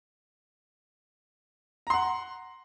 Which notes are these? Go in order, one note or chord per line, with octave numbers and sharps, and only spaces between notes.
F#5 A#5 C6